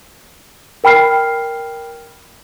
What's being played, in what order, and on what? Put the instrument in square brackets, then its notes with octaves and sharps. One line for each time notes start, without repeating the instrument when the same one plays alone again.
[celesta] A#4 G5 B5 F6 C7